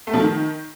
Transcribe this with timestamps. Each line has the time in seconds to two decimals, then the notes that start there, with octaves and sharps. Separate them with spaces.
0.07 A3
0.14 F3
0.20 D#3